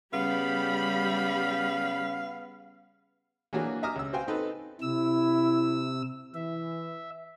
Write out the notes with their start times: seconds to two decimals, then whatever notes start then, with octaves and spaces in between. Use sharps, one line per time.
0.13 C#3 G3 B3 F5 B5
3.53 E3 F#3 A#3 D4 F#4 G#4
3.83 E5 G#5 A#5 D6 D#6 F6
3.96 C#2 E6
4.13 F#4 C5 F5 G5 G#5
4.28 C4 D#4 A4 B4
4.81 C3 E4 E6
6.34 E3 E5